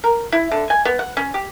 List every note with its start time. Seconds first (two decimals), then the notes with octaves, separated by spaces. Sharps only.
0.04 A#4
0.32 E4
0.52 D3
0.70 G#5
0.85 B3
0.99 F#5
1.17 C#4
1.34 G4